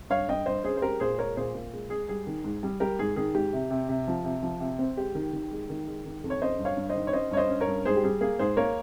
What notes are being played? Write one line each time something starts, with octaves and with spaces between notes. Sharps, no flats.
G2 C#5 F5
G2 D#5 G5
G2 C5 D#5
C#4 G#4 C5
C5
G#3 G4 A#4
A#2 G#4 C5
G#3 A#4 C#5
A#2 G#4 C5
A#2
G#3
G#3 G#4
G3 G#4
D#3
G#2
G3
G3 G4 A#4
G#2 G#4
D#3 G#4
G#2 G4
C3
C3
C3
F3
C3
F3
C3
C4
G#3 G4
D#3
D#3
G#3
D#3
G#3
D#3
F2
C#5
C#4 C5 D#5
G2
C#5 F5
G2
C5 D#5
D#3
C#5
C#4 C5 D#5
G2 C#5
C5 D#5
C#4
A#4 C#5
G2
G#2 G#4 C5
G4
G3 G#4
A#3 G#4
G#2 G#4 C5
A#3 A#4 C#5